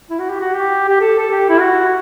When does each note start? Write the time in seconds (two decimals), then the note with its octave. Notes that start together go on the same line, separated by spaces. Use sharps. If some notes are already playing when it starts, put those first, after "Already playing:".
0.10 E4
0.20 F#4
0.30 G4
0.40 F#4
0.55 G4
0.88 G4
1.00 A4
1.19 A4
1.31 G4
1.49 E4
1.60 F#4